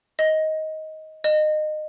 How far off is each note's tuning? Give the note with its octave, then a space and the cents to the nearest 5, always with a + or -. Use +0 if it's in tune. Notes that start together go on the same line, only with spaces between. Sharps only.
D#5 +15
D#5 -25